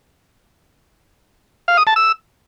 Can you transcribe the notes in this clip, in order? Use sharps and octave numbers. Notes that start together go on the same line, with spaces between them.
F5
D#6
A5
E6